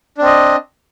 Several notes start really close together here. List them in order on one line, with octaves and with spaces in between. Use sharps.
D4 C4 D#5